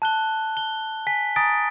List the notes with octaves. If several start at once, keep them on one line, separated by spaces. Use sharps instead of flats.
A5 F#6 G7
G7
G#5 B6
G#5 A#5 D#6 A6 D7